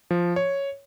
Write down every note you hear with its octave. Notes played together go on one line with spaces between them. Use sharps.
F3
C#5